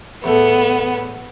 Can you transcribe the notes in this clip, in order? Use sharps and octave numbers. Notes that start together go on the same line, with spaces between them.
E2 A2 B3 A4